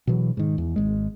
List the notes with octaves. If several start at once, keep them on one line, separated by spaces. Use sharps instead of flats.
B2 E3 F#3
G#2 D#3
E2
G#1 G#3